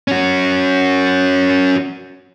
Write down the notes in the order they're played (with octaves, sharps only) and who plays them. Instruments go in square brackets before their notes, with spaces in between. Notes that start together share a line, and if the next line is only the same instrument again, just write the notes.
[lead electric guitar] C#4 F#4